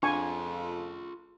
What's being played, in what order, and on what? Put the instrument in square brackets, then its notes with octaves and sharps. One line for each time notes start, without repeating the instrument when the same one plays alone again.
[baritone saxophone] F2 [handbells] D4 [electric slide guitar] F4 G#4 F5 [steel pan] G#5 C#6